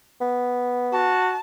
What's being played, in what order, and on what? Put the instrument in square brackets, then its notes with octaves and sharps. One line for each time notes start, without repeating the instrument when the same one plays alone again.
[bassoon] B3
[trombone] F#4 [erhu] A5